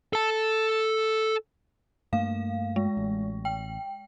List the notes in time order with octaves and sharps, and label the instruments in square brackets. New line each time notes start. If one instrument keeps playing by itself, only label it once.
[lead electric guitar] A4 A5
[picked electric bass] G2 A3 A#3 [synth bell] F5
[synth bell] G#3
[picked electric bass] A1
[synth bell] G5